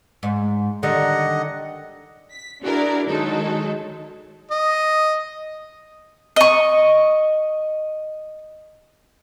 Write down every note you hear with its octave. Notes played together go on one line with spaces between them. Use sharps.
G#2
D3 D#3 G3 D#5 F#5
B6
D4 E4 F#4 G#4 A#4 D5
D#3 F#3 G#3 D#4 A4
D#5
D#5 C#6